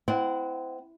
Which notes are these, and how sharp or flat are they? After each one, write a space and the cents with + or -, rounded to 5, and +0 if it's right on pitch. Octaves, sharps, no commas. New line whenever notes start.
C4 -25 E4 +0 F#5 +0